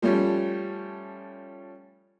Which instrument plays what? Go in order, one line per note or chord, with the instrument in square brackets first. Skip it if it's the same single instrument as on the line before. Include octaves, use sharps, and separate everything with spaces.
[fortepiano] F3 G3 A3 C#4